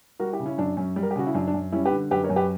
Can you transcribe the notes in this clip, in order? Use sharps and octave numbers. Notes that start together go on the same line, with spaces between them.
G3 F#4 A#4
E4 G4
C#3
C#4 E4
F#2 D4
F#2 C#4
G3
A#4
G4
C#3 F#4
E4
F#2 D4
D4
F#2
G3 C#4 E4
G4 B4
D3
F#2 G4 B4
A#4 C#5
F#2
G4 B4